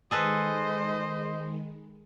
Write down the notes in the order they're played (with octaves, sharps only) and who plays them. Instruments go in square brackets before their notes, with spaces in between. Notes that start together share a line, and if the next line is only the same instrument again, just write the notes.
[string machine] D#3 G#3 [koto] G#4 A4 B4 [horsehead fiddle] C5 D#5